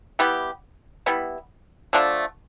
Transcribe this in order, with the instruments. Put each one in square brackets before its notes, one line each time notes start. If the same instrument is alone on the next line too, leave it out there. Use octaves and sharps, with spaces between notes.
[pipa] G3 B3 E4 G4
G3 B3 E4
D3 F3 A3 D4